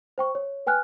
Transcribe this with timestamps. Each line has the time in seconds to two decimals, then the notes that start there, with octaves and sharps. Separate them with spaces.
0.18 C5 G5 C#6
0.35 C#5
0.67 B4 G5 G#5 F6 F#6